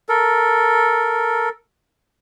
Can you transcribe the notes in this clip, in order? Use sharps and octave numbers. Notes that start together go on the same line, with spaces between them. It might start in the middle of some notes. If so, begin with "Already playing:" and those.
A4 A#4